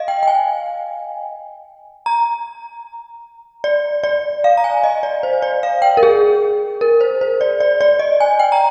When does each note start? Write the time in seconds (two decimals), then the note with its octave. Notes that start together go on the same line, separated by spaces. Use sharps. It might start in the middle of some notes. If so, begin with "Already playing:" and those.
Already playing: D#5 F5
0.08 G5
0.23 G5
0.27 G#5
2.06 A#5
3.64 D5
4.04 D5
4.44 F5
4.57 A#5
4.64 G#5
4.83 D#5
5.03 D5
5.23 C5
5.42 D5
5.63 F5
5.82 G5
5.97 A#4
6.03 G#4
6.81 A#4
7.01 C5
7.21 C5
7.41 D5
7.60 D5
7.81 D5
7.99 D#5
8.20 G#5
8.39 G5
8.52 A#5